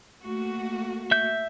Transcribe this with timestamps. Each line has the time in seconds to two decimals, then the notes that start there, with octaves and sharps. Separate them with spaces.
0.23 A3 A#3 F#4
1.11 E5 G6